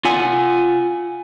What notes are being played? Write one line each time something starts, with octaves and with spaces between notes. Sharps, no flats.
F4 F#5 G#5